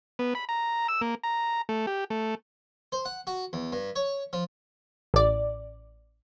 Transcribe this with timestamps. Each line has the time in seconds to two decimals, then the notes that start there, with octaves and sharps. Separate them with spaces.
0.19 B3
0.35 B5
0.49 A#5
0.88 E6
1.01 A#3
1.24 A#5
1.69 A3
1.87 G4
2.10 A3
2.92 C5
3.05 F#5
3.27 F#4
3.53 E2
3.72 G2
3.96 C#5
4.33 F3
5.14 A1 D5